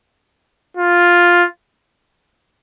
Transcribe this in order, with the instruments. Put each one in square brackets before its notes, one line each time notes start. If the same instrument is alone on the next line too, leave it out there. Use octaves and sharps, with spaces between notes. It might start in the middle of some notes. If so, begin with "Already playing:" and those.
[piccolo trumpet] F4